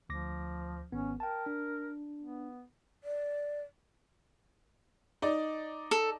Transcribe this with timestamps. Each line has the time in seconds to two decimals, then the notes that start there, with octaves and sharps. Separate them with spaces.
0.09 D2 F3 D6 A#6
0.92 G#1 B3 C#4
1.20 A#4 G5 A5
1.46 D4
2.20 B3
3.04 D5
5.22 D#4 D5
5.91 A4